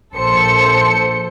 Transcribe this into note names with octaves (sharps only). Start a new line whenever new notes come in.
A#1 A4 C5 C#7